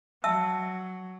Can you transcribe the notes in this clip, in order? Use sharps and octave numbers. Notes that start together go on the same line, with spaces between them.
F#3 E5 A5 E6